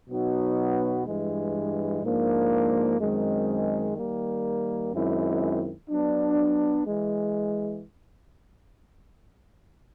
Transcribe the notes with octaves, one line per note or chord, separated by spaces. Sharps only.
B2 F#3 B3 D#4 F#4
G2 E3 G#3
G#2 F3 A#3 D4
F#2 D#3 G#3 C4
D#3 G3 A#3
F#2 D#3 G#3 C4 E4
F#3 B3 D4
E3 G#3